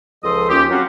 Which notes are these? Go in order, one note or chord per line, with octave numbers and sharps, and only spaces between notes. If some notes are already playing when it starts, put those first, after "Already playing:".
C#2 F3 A4 C5 D#5 D#6
D#2 C#4 F4 G4
F#3 C4 C#4 F4 F#4